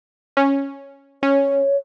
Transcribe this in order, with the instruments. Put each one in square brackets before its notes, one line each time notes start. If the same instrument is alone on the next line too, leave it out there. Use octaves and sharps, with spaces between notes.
[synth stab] C#4
[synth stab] C#4 [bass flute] C#5